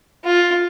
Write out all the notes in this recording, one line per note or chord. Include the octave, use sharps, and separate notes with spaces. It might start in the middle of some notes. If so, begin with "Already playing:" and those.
F4